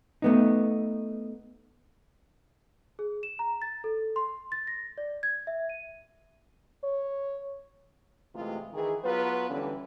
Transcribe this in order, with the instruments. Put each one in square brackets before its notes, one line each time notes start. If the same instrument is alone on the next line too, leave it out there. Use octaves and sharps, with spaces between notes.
[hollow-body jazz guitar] A3 B3 D#4
[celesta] G#4
E7
A#5
A6
A4
C6
A6
A#6
D5
G#6
E5
D#7
[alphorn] C#5
[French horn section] C3 E3 G#3 A3 F4
D#3 E3 G#4
F#3 B3 F4 B4
D3 E3 G3 C#4